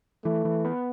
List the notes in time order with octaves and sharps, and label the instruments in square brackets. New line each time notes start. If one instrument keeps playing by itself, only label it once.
[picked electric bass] E3 [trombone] A3
[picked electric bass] E3
B3